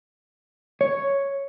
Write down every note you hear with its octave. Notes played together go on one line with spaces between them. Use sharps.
C#5